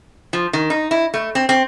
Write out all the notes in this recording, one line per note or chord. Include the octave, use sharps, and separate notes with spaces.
F3
D#3
D#4
E4
A3
C4
C4